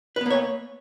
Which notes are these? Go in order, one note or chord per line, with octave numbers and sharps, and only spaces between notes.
A#3 B3 B4 C#5